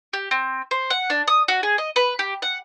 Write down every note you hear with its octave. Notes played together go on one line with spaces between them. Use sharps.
G4
C4
C5
F#5
D4
D#6
F#4
G#4
D#5
B4
G4
F#5